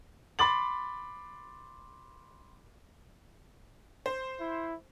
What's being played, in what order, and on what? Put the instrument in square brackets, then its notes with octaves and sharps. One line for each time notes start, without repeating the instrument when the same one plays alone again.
[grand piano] B5 C6 D6 A6 F#7
[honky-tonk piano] C5
[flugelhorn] E4